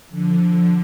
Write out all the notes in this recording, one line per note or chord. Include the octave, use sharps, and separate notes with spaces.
D3 F3